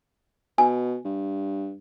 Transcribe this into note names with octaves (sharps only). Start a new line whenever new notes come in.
B2 G#5
G2